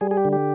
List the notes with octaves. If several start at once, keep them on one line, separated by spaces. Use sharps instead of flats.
G3 G#4
G#4
G4
D3
G4